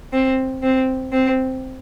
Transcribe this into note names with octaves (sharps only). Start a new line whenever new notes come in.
C4
C4
C4